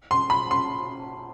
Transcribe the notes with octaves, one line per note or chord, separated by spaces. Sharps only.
C6
B5
C6